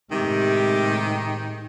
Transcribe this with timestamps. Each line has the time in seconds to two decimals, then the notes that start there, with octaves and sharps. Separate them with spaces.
0.12 A2 C3 D#3 G#3 G4